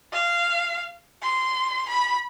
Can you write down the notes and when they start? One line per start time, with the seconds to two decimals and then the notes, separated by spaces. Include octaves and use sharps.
0.13 F5
1.22 C6
1.89 B5